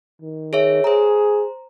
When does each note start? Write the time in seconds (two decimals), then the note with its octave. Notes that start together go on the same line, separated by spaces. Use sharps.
0.22 D#3
0.53 G#4 C#5 E5
0.84 G#4 C5 A#5